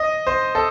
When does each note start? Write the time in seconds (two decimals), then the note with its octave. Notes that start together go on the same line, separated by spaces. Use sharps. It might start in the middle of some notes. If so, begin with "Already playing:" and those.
Already playing: D#5
0.27 C5
0.55 A4